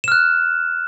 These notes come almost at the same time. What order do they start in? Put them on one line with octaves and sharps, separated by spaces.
E7 F6 F#6